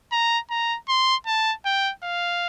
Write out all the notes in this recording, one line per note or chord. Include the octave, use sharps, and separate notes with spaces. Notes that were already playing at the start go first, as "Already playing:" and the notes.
A#5
A#5
C6
A5
G5
F5